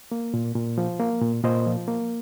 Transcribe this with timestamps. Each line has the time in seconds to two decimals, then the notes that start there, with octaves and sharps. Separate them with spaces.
0.12 A#3
0.34 A#2
0.55 A#2
0.78 F3
1.00 A#3
1.22 A#2
1.44 A#2 C5 D#5
1.67 F3
1.88 A#3